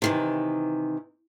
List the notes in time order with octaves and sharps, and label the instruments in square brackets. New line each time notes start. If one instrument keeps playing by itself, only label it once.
[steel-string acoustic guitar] C3 D#3 E3